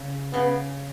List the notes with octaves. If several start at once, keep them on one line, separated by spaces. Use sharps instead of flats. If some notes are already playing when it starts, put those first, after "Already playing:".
Already playing: C#3
C#3 B3